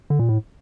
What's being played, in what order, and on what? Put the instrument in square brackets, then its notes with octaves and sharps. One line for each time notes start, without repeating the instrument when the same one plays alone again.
[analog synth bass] D3
A#2
A2